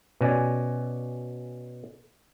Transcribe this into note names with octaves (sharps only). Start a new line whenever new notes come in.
B2 C#4 D5 G#5